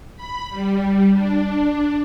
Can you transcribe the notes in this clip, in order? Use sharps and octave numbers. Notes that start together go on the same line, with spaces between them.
B5
G3
D4